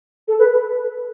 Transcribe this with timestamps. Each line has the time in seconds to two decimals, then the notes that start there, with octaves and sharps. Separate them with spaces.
0.28 A4
0.39 B4